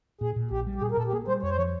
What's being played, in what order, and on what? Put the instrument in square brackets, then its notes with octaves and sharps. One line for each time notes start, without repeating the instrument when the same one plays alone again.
[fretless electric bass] A#2 [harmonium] G#4
[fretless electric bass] A#2
[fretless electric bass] A#1 [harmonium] G4
[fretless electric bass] G3
[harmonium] G4
[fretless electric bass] A#2 [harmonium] G#4
[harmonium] A#4
[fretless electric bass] A#2 [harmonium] A4
[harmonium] G4
[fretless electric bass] A#3 [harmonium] G#4
[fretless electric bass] G3 [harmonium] C5
[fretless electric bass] F2 [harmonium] C#5
[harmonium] C5
[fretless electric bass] F3 [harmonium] C#5